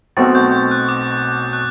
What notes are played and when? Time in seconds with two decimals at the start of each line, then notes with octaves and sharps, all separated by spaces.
0.17 B1 B2 A3 C4 F#4 A6
0.35 G6
0.53 G6
0.71 F#6
0.89 D6
1.53 F#6